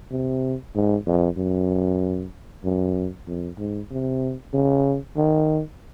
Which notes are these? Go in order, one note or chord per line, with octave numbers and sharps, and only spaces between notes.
C3
G#2
F2
F#2
F#2
F2
G#2
C3
C#3
D#3